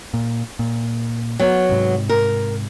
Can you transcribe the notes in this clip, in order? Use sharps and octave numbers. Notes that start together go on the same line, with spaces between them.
A#2
A#2
F#3 B3
G#2 C3
A#4